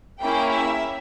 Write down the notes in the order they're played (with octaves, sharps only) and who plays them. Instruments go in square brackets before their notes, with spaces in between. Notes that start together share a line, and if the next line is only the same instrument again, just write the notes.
[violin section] A#3 C#4 E4 G#4 G5
E5